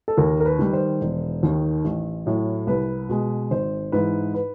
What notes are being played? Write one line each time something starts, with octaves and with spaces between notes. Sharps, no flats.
A4
D#2 A#4
A#4
B4
D#3 G3
C5
E1
D#2 D#3
A1
A2 F#3
C2 B4
B2 G#3
G#1 C5
G#2 E3 B4
B4